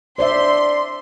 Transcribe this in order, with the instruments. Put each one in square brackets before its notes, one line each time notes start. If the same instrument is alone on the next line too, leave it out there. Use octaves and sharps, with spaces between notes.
[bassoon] D4 [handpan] C5 D5 E5 [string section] C6